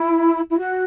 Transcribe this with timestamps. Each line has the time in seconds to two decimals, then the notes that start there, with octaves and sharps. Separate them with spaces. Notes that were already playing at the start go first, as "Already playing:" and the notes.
Already playing: E4
0.49 E4
0.58 F#4